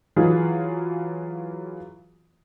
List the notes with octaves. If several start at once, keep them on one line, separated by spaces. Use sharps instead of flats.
E3 F#3 F4 G#4